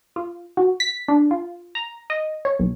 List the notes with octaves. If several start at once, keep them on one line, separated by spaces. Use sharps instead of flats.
F4
F#4
B6
D4
F4
A#5
D#5
C#5
B1